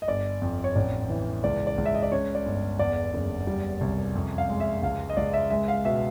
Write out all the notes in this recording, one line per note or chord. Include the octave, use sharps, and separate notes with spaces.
D#5
G1 D5
F2
C#5
A1 D5
E3
C#2 D5
D5
C#2
E5
D#5
D5
C#3 C#5
D5
G1
E2 D5
F#1
G3
C2
F2
F5
G#3
E5
C#2 F5
D#5
C#2 D5
E5
G#3 E5
F5
B2 E5